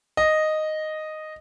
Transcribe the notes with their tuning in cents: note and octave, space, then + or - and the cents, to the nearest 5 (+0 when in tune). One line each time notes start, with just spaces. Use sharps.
D#5 -5